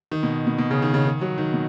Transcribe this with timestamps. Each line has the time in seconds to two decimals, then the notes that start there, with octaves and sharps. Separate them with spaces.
0.12 D#3
0.23 B2
0.47 B2
0.58 B2
0.71 C#3
0.82 D#3
0.94 C#3
1.06 D#3
1.21 F#3
1.38 D#3
1.53 B2